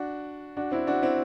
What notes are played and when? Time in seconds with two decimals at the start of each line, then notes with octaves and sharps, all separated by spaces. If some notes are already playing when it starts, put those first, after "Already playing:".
Already playing: D4 F#4
0.57 D4 F#4
0.72 C4 E4
0.87 D4 F#4
1.02 C4 E4